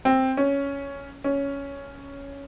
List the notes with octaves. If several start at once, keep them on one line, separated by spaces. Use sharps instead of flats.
C4
C#4
C#4